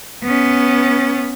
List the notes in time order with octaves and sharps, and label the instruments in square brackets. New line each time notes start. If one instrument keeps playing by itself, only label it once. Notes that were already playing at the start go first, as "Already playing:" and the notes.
[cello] B3 C#4